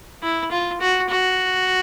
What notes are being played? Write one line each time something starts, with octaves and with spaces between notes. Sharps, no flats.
E4
F4
F#4
F#4